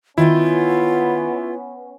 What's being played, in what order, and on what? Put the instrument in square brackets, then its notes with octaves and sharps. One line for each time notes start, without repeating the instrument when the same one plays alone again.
[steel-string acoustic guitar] D#3 G5 [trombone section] B3 C#4 [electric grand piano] E4 [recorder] F4